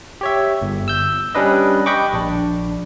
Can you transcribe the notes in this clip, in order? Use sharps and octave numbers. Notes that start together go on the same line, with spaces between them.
G4 C#5 E5
G1
E6 G6
G3 C#4 D4 B4 D#5
D#5 G5 B5 C#6 D6
A#1 D4